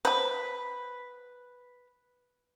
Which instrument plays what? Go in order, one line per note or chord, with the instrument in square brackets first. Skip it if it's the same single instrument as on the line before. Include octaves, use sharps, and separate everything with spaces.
[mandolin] B4 [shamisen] C5 B5